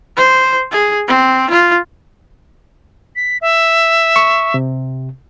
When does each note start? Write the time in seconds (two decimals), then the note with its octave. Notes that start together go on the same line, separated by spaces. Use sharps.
0.17 C5
0.72 G#4
1.08 C4
1.50 F4
3.16 B6
3.41 E5
4.16 C#6
4.54 C3